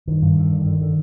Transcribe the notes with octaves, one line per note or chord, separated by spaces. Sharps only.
G2 D#3
G2
D3
D3
D3
D3